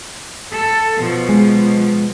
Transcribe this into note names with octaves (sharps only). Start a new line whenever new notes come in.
A4
B2 F3
G#3